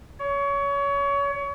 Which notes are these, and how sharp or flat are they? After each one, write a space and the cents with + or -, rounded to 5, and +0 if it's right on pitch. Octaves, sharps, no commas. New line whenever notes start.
C#5 +25